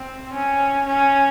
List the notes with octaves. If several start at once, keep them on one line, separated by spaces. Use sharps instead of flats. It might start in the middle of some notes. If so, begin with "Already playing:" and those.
Already playing: C4
C#4
C#4